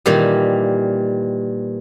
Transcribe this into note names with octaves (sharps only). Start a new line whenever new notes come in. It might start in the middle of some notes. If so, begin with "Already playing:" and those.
A#2 D#3 E3 G3